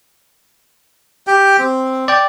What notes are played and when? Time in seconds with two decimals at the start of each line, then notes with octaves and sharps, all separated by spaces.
1.27 G4 G5
1.59 C4
2.08 D5 G5